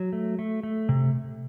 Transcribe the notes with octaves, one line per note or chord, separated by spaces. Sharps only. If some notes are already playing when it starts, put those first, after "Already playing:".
Already playing: F#3
A3
A3
A3
C3